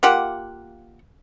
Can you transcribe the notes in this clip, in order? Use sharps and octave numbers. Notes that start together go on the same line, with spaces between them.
A#3 F4 G4 F#5